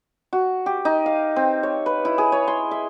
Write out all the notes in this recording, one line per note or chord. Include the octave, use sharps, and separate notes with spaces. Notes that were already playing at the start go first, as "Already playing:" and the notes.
F#4
G4
D#4
F5
C4
C#5
B4
E4
G#4
C#5
C6
E5